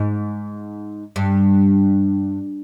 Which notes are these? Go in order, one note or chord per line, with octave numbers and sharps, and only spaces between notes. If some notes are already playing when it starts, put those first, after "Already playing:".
Already playing: G#2
G2